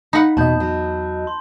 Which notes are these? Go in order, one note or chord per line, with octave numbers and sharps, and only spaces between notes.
D#4 F#5 B5
E2 B2 D#5 A5 B5 G6
F#3
C6